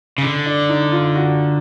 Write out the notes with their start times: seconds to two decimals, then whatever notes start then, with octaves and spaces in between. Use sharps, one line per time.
0.18 C#3
0.22 D3 D4
0.46 D4
0.69 D#4
0.92 F4
1.15 F#4